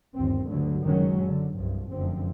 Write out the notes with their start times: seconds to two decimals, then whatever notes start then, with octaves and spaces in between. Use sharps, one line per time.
0.16 G1 D#2 C4
0.48 D2 G2 D3 F#3
0.84 F#1 D#3 F#3 G#3 C#4
1.24 D3
1.56 C2 G2 F3
1.90 F1 F#2 D3 F3 C4